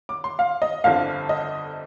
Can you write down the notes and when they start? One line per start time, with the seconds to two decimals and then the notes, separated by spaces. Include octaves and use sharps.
0.09 D6
0.24 C6
0.39 F5
0.62 D#5
0.84 G1 F2 D3 F3 F5
1.29 D#5